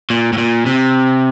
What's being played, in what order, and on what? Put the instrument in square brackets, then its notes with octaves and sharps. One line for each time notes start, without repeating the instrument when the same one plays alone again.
[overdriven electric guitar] A#2
A2
A#2
C3